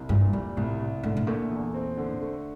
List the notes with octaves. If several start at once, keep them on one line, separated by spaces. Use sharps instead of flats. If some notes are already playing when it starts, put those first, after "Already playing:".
Already playing: C2
G2 A#2
F2 G3
C2 A2
C2
A2 D3
A2
A#2 A3
E2
C4
D3
A3